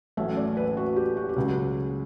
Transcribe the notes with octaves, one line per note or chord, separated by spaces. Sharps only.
A1 A2 F#3 A3 C#4 E5
D5
B4
F#4
G4
F#4
G4
C#2 C#3 F#3 F#4